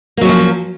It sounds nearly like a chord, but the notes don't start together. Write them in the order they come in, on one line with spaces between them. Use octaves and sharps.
A#3 F#3 C#4 F3